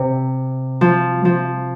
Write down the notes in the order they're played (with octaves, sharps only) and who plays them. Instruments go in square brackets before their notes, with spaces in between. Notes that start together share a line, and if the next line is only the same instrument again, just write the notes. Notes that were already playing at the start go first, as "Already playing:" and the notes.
Already playing: [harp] C3
F3
F3